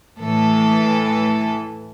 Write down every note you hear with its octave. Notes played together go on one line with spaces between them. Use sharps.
A2 E3 A4